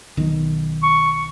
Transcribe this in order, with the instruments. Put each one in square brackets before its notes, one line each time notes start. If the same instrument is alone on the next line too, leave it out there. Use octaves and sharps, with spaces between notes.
[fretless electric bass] B1 D#3
[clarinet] C#6